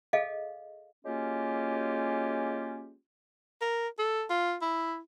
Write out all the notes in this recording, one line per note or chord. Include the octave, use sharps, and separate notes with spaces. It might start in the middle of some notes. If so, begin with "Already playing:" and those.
G#4 A4 D#5 F5
F#3 G#3 A#3 C#4 F4 G4
A#4
A4
F4
E4